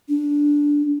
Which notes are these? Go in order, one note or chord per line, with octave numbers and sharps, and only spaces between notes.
D4